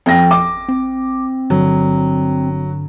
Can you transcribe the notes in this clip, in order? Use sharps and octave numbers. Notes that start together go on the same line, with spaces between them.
F2 G5 A#6
G#1 D6
C4
G1 G2 D3 F#3